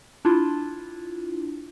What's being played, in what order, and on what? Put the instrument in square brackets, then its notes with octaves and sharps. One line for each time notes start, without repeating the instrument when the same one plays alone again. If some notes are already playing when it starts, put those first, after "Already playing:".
[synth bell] D4 E4 F4